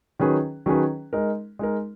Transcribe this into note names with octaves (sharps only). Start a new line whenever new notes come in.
D#3 F#3 C#4 G#4 B4
D#3 F#3 C#4 G#4 B4
G#3 D#4 A#4
G#3 D#4 A#4